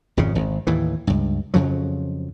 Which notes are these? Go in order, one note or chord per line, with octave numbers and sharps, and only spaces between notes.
G#1 F2 G#2 C#3
G#1
D#2 A2 E3
C#2 G2
F2 C#3 F3 F#3